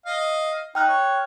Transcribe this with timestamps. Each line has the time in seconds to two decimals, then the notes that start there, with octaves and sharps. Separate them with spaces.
0.06 D#5 F5
0.75 D#4 G5 F6 F#6
0.88 C#5